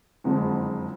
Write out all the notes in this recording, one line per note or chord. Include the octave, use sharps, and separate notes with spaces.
F#1 F2 D3 F3 G#3